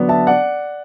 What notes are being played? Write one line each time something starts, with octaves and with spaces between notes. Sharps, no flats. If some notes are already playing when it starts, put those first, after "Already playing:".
Already playing: D3 F#3 B3 D4
E5 A5
D5 F#5